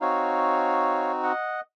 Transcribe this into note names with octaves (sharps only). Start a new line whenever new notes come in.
C4 D#4 F#4 C#5 F5
D#5 F#5